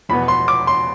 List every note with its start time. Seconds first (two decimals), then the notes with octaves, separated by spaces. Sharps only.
0.09 F1 E2 B2 B3 B5
0.28 C6
0.48 D6
0.67 C6